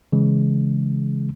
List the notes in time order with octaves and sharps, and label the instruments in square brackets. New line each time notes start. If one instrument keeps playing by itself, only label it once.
[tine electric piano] C#3 E3 G#3